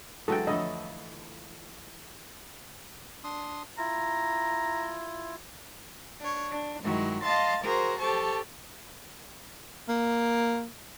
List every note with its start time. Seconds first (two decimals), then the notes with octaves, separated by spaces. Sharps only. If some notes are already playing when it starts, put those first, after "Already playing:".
0.28 E3 F#3 G#3 F#4 A4 G5
0.47 F2 D3 A3 E4 D#5
3.24 D4 C6 D#6
3.78 E4 F4 A#5
6.20 D4 C#5
6.52 D4
6.83 G2 D#3 F#3 G#3 E4
7.23 D#5 F5 A5 C6 A6
7.64 F#4 G#4 A#4 C5
8.00 G4 A4 C5 A5 C#6
9.88 A#3